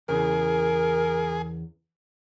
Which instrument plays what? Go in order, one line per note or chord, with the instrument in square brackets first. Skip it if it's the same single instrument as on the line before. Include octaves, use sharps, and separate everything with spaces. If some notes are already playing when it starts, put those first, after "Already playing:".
[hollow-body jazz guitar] E2 C#3 [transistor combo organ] G#4 [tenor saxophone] A#4